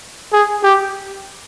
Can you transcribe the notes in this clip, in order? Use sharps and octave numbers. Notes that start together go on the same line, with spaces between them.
G#4
G4